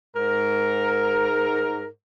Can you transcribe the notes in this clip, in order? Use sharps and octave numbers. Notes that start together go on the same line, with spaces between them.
G#2 A#4